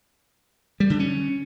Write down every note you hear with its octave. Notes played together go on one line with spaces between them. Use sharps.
G3
D3
C#4